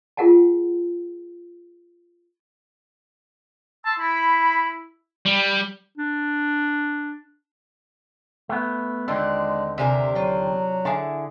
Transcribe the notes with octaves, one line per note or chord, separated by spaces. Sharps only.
F4 G#4 A#4 F#5 G5 A5
A5 C6 E6
E4 B5
G3
D4
A3 B3
D#2 D3 G#3 C4 D4 F4
C3 D4 A#4 E5 G#5 A#5
F#3 F4 G5
D3 E4 G#4 A5